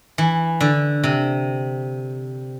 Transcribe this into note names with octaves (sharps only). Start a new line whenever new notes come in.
E3
D3
C3